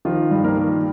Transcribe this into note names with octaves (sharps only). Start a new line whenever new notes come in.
D#3 F3 F4
G2
A#3 A#4
D#3